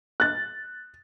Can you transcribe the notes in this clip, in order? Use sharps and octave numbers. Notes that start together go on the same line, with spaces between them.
F#6 A6